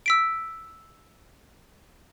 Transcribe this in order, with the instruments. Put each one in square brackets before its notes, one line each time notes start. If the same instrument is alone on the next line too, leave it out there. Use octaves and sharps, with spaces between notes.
[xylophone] E6 B6 D7